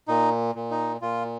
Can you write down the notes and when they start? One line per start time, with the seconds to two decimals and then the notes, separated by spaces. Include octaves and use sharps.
0.08 A#2 D#4
0.55 A#2
0.71 D#4
1.01 A#2 F4